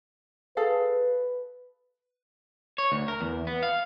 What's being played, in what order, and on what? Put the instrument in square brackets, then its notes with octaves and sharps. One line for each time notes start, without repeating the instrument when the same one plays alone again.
[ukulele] G#4 A4 F5 [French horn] B4
[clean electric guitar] C#5
D2
A#4
E2
B3
F5